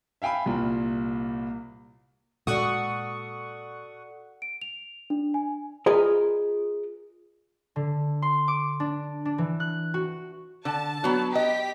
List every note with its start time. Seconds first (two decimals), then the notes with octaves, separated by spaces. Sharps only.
0.22 E5 F5 G5 G#5 B5
0.46 C2 A#2
2.47 A#2 G#3 F#4 A4 D5 F#5 C#6 D#6
4.42 D7
4.62 F7
5.10 D4
5.34 G#5
5.86 F4 G#4 A#4 B4 D#5
7.76 D3
8.22 C6
8.48 D6
8.80 D4
9.25 D4
9.38 E3
9.60 F#6
9.94 F#4
10.65 D3 A5
11.04 F#3 B3
11.35 G4 D#5 B6